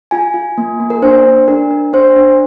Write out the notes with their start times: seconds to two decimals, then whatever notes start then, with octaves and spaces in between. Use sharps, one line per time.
0.11 F4 G#5
0.34 F4
0.58 A#3
0.80 A#3
0.90 A#4
1.02 D4 C5
1.25 D4
1.48 D4 A#4
1.71 D4
1.93 D4 C5
2.16 D4